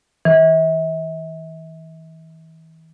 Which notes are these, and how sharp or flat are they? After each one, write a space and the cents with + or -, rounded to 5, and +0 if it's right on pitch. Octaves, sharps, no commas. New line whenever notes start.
E3 -40